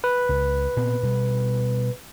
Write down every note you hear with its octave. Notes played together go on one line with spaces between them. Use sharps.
B4
C#2
A#2 B3 C4
B2 G3